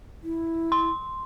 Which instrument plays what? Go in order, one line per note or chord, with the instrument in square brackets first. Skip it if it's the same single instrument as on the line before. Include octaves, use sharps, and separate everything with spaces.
[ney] E4
[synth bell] C6